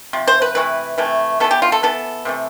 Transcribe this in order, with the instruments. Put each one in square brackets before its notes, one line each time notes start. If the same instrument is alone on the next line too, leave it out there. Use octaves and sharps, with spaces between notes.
[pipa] C3 F3
C5
B4
C3 E3 A3 B4
C3 E3 A3
E3 B3 A4
G4
F4
A4
E3 B3 A4
C3 E3 A3